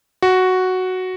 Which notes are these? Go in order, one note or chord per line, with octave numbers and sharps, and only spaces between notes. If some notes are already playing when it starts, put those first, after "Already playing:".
F#4